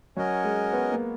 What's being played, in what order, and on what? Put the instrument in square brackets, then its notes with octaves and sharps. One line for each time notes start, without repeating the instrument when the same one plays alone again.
[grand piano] F#3 [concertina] C#4 F#4 A#4 D#5 G#5
[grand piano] G#3
B3
A#3